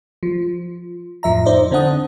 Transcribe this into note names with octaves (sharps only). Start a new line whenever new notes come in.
F3
F2 A2 F3 E5 A#5
D#4 C5 D5 D#5
D3 C4 D4 F#5 D#6